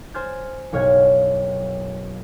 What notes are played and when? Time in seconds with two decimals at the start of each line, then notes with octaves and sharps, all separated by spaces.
0.14 C5 G#5 C6 F6 G6 A6
0.72 F#1 B1 C#5 F5 F#5 G#6